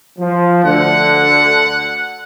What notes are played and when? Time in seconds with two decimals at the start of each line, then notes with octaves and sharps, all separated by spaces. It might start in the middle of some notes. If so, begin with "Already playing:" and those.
0.19 F3
0.65 D2 D3 F#5